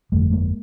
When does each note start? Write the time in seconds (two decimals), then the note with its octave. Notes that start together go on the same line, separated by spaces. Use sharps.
0.12 G1 F2 D3 G3 A3
0.32 G#3 A#3